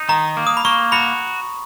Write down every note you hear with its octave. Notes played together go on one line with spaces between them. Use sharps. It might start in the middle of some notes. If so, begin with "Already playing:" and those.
Already playing: D#4
D#3 A#5
A#3
D#6
B5
A#3 C#6
F#4 B5